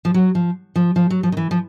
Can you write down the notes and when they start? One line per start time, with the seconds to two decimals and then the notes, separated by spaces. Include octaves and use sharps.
0.05 F3
0.14 F#3
0.35 F3
0.76 F3
0.96 F3
1.10 F#3
1.23 F3
1.32 D#3
1.37 E3
1.51 F3